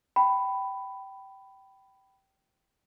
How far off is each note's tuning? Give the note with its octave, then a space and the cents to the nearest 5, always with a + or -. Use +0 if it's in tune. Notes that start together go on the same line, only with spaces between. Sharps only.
G5 -20 B5 +10